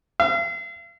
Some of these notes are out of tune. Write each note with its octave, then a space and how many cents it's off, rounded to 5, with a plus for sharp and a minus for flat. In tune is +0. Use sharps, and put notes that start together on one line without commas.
F5 -40